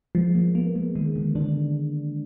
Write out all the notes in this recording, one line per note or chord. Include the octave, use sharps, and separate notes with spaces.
F3 G#3
A#3
A#3 B3
G#3
D#3 G#3
D3
D3 D4